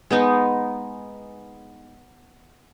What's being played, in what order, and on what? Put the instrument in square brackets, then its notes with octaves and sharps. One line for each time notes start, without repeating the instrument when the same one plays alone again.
[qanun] G#3 B3 D#4